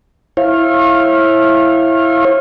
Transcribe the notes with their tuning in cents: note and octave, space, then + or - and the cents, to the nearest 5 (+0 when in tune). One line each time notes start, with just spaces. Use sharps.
E4 +0 C#5 -40 F5 +0